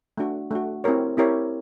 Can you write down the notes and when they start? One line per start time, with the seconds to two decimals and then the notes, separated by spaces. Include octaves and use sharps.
0.17 A3 D4 F#4
0.51 A3 D4 F#4
0.84 C4 E4 G4 A#4 C#5
1.17 C4 E4 G4 A#4 C#5